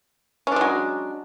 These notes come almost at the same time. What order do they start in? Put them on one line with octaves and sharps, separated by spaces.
C#4 D4 G#3 F#3